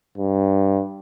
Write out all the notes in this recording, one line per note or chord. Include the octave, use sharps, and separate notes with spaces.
G2